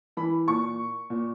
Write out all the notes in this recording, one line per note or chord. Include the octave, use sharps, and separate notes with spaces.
E3 B5
A#2 C#6
A#2